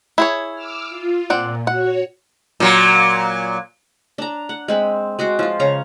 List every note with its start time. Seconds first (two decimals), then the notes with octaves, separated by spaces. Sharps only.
0.18 E4 G#4 C#5
0.55 D6 E6 F6
0.90 F4
1.30 A#2 C4 D5 F#5
1.67 F#4 C#5 F#5
2.60 A#2 F#3
4.18 D4 A#5
4.49 F#5
4.68 G#3 C4 B5
5.19 G#3 F#4 C6 D6
5.39 F3 F4
5.60 C#3 C#5 F5 A#5